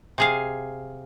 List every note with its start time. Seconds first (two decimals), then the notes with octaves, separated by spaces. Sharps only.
0.18 C3 G#4 F5